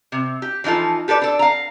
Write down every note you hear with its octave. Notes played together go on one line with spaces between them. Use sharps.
C3
G4
E3 F3 D#4 F4 A4
G4 A4 B4 D5
D4 A4
F5 A#5